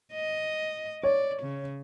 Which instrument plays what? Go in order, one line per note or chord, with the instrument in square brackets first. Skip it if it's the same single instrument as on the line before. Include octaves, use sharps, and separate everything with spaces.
[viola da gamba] D#5
[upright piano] C#5 [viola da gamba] D5
[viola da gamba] C#3